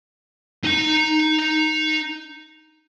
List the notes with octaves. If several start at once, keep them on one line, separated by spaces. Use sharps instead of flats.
D#4 A#5